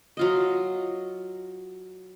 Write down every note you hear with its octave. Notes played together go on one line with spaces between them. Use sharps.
F#3 F4 D#5